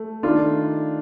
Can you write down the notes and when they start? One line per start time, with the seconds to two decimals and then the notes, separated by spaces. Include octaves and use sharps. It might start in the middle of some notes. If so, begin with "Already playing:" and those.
Already playing: A3
0.23 D#3 A3 D4 F4